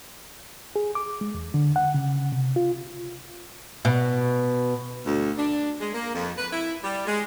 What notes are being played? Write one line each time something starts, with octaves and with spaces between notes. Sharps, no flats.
G#4
D6
G#3
E2
D3
F#5
C#3
C3
F4
B2
D2
D4
G#3
A#3
F2
B4
E4
G3
G#3